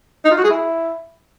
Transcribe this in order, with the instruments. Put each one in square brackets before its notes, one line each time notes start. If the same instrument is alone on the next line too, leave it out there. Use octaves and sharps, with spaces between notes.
[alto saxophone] D#4
F4
F#4
G#4
E4